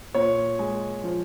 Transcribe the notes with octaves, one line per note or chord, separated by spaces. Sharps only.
A#2 C#5
G#3
F3